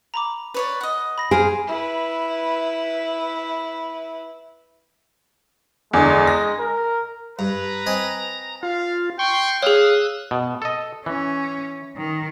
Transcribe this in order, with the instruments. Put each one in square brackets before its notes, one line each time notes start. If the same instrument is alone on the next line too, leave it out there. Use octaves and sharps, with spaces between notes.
[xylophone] A#5 B5 D6
[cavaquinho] B4 C#5 D5
D#5 F#5
[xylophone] B5 A#6
[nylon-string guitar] G#4 [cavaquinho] C5 F5 [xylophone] D7
[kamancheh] E4 B4
[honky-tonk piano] E2 D3 [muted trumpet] G#3
[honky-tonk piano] A#6
[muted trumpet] A#4
[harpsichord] G2 [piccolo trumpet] B4 [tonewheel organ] A#5
[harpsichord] C4 D#5 G#5
[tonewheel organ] F4 [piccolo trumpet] F5
[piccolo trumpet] G5 [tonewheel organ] C6 C#6
[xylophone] G#4 C#5 [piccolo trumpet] F5 [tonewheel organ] D#6 E6 F#6
[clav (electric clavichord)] B2
A4 D#5
[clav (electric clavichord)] E3 [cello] C#4
[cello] D#3